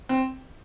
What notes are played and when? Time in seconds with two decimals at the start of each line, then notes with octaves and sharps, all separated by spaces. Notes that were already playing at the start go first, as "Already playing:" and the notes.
0.09 C4